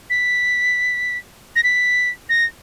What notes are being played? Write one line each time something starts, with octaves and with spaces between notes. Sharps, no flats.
B6
A#6
B6
A#6